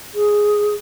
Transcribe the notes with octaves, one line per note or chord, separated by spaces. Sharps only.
G#4